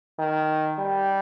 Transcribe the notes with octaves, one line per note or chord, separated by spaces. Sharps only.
D#3
G3